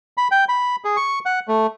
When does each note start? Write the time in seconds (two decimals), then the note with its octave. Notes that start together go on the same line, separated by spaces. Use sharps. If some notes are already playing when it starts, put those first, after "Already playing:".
0.17 B5
0.31 G5
0.49 B5
0.84 G#4
0.97 C#6
1.26 F#5
1.48 A3